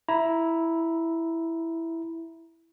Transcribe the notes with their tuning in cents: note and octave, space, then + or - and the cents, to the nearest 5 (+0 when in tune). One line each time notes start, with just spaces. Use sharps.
E4 +0 A#5 +15